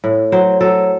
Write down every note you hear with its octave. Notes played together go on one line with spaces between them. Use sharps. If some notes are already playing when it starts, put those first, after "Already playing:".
A2
F#3 C5
F#3 A4